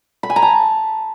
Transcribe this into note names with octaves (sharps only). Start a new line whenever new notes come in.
B5
G#5
A#5
A5